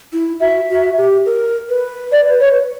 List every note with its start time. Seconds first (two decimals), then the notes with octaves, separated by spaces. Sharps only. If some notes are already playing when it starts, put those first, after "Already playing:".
0.13 E4
0.40 F#4 E5
0.70 F#4
0.98 G4
1.26 A#4
1.69 B4
2.12 D5
2.40 C#5